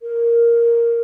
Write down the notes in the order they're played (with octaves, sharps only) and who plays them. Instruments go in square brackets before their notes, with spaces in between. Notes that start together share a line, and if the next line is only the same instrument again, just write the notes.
[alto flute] A#4